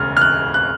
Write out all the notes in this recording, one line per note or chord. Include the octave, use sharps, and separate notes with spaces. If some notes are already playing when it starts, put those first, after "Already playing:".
Already playing: E1 D2 C#3 F6
F6
F#6
F#6